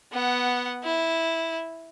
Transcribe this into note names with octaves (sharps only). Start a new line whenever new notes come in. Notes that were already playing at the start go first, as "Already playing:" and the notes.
B3 F#5
E4